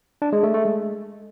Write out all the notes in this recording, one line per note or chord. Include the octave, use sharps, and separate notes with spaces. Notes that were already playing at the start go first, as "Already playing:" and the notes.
D4
G#3
A3
A3
G#3